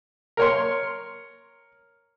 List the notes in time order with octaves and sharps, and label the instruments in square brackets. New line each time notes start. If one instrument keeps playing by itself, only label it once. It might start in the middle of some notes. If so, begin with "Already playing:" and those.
[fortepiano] A#4 C#5 C6